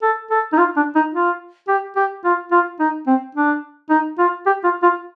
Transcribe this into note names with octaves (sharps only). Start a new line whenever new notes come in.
A4
A4
D#4
F4
D4
D#4
F4
G4
G4
F4
F4
D#4
C4
D4
D#4
F4
G4
F4
F4